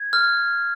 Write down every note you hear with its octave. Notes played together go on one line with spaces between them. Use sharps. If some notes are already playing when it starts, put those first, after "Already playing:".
Already playing: G#6
F6